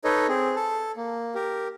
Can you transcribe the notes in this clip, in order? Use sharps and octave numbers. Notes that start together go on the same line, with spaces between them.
D#4 A4 B4 C#5 D#5
C4 G#4
A4 A5
A#3
G4 A#4